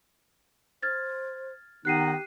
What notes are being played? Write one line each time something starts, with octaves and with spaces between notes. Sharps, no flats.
C5 F6 G#6 A6
D#3 B3 D#4 G4 F#6 C7 D#7